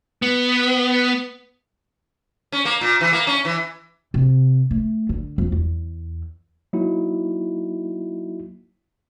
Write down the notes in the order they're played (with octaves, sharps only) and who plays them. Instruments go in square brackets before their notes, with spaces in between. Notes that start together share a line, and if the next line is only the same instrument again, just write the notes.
[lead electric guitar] B3
[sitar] C#4
A#3
A#2
E3
A#3
C#4
E3
[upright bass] C3
A3
D3
F2
E2
[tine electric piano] F#3 A#3 D#4 E4 F#4